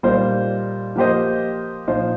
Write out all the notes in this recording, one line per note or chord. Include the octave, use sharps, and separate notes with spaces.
A#2 G3 A#3 D#4 C5
F3 A#3 G4 C5 D#5
A#2 F3 D#4 C5